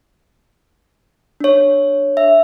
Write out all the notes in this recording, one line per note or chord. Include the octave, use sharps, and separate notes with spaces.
D4 C#5
E5